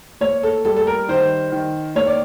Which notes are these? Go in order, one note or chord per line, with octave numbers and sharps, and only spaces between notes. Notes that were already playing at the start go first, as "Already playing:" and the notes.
A#3 C#5
A4
G3 A4
A4
A#4
D#3 C5
D#3
A#3 C#5
D5